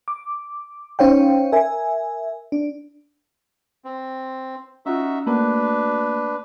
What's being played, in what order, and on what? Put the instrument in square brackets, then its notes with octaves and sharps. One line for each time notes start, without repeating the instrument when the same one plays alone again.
[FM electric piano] D6
C#4 D#4 C5 C#5 F5 G5
A#4 E5 G#5
D4
[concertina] C4
[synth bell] C#4 F4 [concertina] D#4 F#4 E5
[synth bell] A3 A#3 F#4 [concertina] D4 B4